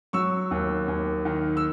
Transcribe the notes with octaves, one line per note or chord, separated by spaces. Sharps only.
F#3 C#6 E6
D#2
D#2
D#3
E6